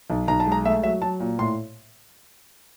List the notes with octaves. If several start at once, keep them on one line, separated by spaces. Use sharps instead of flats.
B1
B1 A#5
A5
G#3
A#5
A3 E5
F#3 E5
F#3 A5
A#2
A2 C6